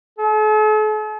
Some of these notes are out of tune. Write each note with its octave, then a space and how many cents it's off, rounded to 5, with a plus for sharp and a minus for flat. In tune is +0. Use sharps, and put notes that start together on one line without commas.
A4 -45